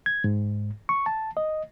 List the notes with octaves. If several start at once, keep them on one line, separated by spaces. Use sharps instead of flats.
G#6
G#2
C#6
A5
D#5